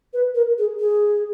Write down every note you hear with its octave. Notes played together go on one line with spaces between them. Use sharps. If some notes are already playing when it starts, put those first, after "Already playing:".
B4
A#4
G#4
G#4